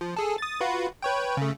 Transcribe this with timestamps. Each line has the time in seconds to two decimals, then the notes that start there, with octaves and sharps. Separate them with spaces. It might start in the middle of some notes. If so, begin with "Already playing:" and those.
0.01 F3
0.17 G#4 A4
0.38 D#6 A6
0.61 F4 F#4 B4
1.02 B4 C#5 G5
1.37 C#3 A3